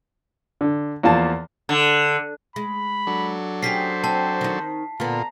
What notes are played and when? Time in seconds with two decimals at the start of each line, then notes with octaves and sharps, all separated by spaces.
0.61 D3
1.03 E2 F3 A#3 A5
1.69 D3
2.56 G#3 B5
3.07 F#3 D4 A4
3.63 C#4 G4 G#4 C5 B6 C7
4.04 C4 A5
4.41 D#3 D#4
5.00 A#2 D3 B3 F4 A#5